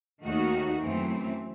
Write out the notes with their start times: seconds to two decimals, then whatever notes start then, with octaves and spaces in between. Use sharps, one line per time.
0.24 D#2 D#3 A3 D#4 F#4
0.81 F#2 E3 A3 C4